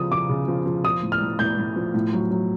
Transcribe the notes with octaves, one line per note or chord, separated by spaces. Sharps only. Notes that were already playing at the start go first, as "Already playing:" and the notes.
Already playing: C#3 F3 D#6
F3 D6
C#3
F3
F3
F3 D#6
A2
F6
A2
A2 G6
A2
F3
A2
F#3
F#3